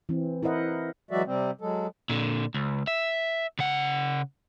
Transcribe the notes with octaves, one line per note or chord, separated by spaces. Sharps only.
E3 C4
E4 A#4 C5 D#5 F#5
E3 F#3 G#3 F#4 D5 E5
C3 G3 C4
F#3 G#3 A4
A#2 D3
C#2
E5
C#3 F#5